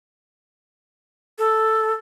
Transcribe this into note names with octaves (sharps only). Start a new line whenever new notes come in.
A4